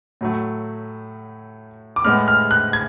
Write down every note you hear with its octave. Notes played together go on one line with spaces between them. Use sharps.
A2 F#3 A3
D6
A2 G#3 B3 F6
F6
F#6
G#6